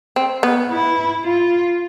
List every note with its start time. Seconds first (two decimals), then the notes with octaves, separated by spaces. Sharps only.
0.16 C4
0.43 B3
0.70 E4
1.24 F4